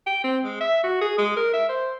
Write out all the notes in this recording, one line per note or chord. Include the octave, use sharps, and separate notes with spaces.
G5
C4
G#3
E5
F#4
G#4
G#3
A#4
E5
C5